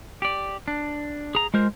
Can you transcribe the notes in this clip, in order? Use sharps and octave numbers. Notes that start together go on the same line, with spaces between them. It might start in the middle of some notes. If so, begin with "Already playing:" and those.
G4 D5
D4
G#4 A#5
G#3 F4 A#4 C5